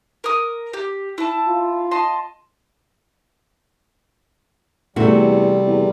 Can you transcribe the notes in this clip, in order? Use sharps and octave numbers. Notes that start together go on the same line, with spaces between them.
A#4 D#6
G4
E4 A5
F4
D#5 A5 C6
E2 C3 G3 A3 F#4
E2